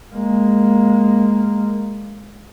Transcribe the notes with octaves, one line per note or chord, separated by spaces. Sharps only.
G#3 A#3